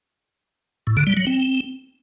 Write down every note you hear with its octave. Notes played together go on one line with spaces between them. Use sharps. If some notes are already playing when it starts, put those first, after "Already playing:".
A2
D3
G3
F#3
C4